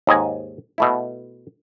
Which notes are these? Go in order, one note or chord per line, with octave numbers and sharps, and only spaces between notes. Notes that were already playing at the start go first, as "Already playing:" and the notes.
D#2 G#2 D#5 G#5
B2 A3 E4